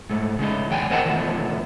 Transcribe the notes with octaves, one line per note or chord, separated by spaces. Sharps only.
G#2 A3
C#3 G#3 D#4
E2 G5 G#5
E2 C4 A#4 D#5 F#5 A5
E2 B2 D#3 F3 A3